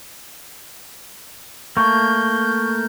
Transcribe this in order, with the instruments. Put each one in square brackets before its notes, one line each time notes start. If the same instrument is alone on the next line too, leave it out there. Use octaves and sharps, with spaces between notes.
[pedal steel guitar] A3 A#3 [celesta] C#6 [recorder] G6